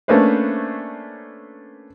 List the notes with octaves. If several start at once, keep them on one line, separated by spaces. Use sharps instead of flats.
A3 A#3 C#4 D4 B4 C5